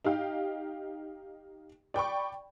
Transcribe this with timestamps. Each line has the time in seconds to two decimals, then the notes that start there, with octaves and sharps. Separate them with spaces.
0.05 D#4 G4 F5 G5
1.94 D5 G5 B5 C#6